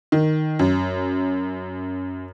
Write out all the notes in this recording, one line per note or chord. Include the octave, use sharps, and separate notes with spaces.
D#3
F#2